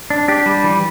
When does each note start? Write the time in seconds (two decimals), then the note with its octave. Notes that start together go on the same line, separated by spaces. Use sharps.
0.10 D4
0.28 D4 G4
0.46 G3
0.64 E3